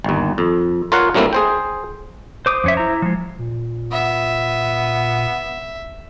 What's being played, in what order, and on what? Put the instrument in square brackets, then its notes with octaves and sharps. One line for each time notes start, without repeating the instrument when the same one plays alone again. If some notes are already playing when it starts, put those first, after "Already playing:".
[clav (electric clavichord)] G1 D#2
F2
F4 A#4 C#5 F5 F#5
G2 F#3 A3 A#3 C4 E4
G#4 C5 G5
[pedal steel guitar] C5 D6 D#6
[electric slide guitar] F2 C#4 E5
E4 A#5
F3 G#3
[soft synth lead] A#2
[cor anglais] B3 [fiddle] E5